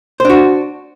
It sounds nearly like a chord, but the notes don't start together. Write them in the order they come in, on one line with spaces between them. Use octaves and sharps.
C5 D4 F#4